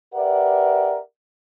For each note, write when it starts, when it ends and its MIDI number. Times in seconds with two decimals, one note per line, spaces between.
0.14 0.99 67
0.14 0.99 70
0.14 0.99 71
0.14 0.99 74
0.14 0.99 76
0.14 0.99 78